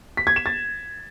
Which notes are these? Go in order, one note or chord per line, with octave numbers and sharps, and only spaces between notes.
B6
G#6
E7
A6